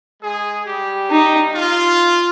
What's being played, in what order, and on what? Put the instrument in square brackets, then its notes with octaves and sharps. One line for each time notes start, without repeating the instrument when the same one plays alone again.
[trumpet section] G#3 G#4
G3 G4
[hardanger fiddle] D#4
[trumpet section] F4